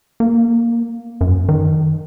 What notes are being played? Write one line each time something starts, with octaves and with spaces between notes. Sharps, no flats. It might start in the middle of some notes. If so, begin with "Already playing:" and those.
A#3
F#2
D#3